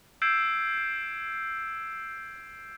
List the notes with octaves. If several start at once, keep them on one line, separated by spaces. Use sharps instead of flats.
E6 G6 G#6 C7 D7 E7